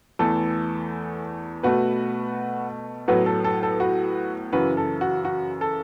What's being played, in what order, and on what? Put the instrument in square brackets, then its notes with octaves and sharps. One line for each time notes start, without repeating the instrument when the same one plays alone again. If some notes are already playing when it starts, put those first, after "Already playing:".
[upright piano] E2 E3 A3 A4
B2 A3 F#4 B4
A2 F#3 B3 F#4 B4
A4
A4
A4
F#4 B4
F#2 C#3 E3 F#4 B4
A4
F#4
F#4
A4